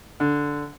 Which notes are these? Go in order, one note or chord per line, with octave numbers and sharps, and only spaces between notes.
D3